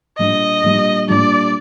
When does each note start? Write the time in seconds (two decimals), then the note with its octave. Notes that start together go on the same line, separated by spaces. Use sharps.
0.18 A#2 G3 D4 D#5
0.64 A#2 G3 D4
1.08 A#2 G3 D4 D5